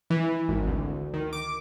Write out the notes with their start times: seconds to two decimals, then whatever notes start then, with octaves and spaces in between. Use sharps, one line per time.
0.10 E3
0.49 G#1
0.67 D2
1.14 D#3
1.33 D6